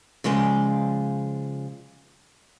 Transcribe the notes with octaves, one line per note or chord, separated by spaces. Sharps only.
C#3 F3 G#3 D5